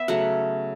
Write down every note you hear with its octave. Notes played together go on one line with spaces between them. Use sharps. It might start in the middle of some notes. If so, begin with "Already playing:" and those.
Already playing: B3 E5
C#3 F#3 A3 F#5